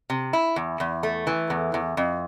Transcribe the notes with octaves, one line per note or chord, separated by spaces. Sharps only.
C3
E4
E2
E2
A3
E3
E2
E2
F2